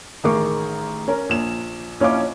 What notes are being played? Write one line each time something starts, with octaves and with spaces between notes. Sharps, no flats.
A1 D#3 G#4 A#4 C#6 D6
C#4 A#4
A#1 E7
A#1 C#4 E4 D#5 F5 D6